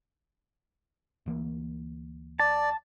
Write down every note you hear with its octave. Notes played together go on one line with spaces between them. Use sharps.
D2 E3 A#3
D5 A5